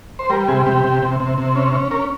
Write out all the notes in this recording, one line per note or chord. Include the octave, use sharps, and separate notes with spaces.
C5
G3 A#4
C3 G#4
C3 G4
C3
C3
C3
C3
C#4
C#4
C#4 A#4